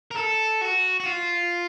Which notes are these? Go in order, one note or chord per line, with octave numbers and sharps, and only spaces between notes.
A#4
A4
F#4
F#4
F4